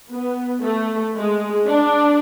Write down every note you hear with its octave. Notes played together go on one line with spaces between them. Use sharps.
B3
A3
G#3
D4